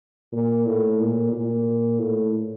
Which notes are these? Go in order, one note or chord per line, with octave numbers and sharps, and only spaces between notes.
A#2
A2
A#2
A#2
A2